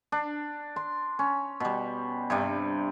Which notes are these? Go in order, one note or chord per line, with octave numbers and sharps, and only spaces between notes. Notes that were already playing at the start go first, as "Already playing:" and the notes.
D4
C6
C#4
B2 G3
G2 C3 G3